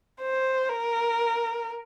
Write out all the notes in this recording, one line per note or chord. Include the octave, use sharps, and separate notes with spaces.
C5
A#4